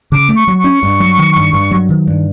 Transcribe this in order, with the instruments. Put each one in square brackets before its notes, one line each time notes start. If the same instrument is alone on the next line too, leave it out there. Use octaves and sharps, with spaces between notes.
[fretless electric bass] C#3 [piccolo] D6
[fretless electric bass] A3
[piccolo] C#6
[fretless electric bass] F#3
[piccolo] C#6
[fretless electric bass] C#4
G2
F#3
D#3
G2
G2
F#3
D#3
G2